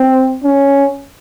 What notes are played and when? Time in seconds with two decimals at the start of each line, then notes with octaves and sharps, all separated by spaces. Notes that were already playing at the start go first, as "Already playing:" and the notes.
Already playing: C4
0.44 C#4